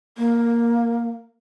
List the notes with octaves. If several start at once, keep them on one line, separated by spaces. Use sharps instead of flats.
A#3